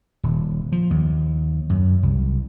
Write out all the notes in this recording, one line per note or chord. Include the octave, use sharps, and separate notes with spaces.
D#1
F3
D#2
F#2
C2